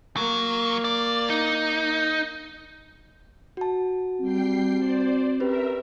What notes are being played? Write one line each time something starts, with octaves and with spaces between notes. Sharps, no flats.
F#3 A#3
D5
D#4
F#4 A5
G3 C4 G5 C7
C5 D5
C#4 G4 A#4 B4 E5